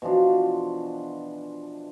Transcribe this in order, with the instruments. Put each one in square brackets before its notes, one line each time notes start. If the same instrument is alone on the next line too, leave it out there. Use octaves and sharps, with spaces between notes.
[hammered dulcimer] B2 E3 F3 D4